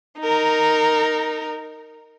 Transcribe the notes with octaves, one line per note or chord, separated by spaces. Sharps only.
D#4 A#4